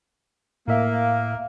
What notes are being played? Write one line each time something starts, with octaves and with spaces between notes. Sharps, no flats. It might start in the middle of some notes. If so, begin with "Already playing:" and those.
A2 A#3 E5 F5